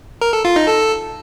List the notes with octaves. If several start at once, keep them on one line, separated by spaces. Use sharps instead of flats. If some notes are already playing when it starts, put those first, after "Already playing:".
A#4
A4
F4
D#4
A4